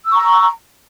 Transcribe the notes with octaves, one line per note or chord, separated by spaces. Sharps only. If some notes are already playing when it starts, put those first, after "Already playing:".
A#5 C#6 E6